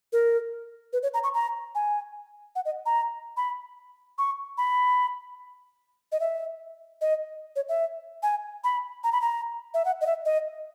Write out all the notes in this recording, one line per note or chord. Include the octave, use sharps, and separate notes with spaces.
A#4
B4
C#5
A#5
C#6
A#5
G#5
F#5
D#5
A#5
B5
C#6
B5
D#5
E5
D#5
C#5
E5
G#5
B5
A#5
B5
A#5
E5
F#5
D#5
E5
D#5